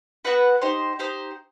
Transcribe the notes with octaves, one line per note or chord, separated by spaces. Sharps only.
B3 F#4 B4 F#5
D#4 G4 C5
D#4 G4 C5